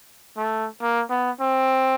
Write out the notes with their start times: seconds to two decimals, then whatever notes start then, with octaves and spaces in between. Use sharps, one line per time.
0.37 A3
0.81 A#3
1.10 B3
1.40 C4